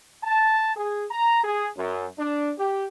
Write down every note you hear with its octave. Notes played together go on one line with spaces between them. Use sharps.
A5
G#4
A#5
G#4
F#2
D4
G4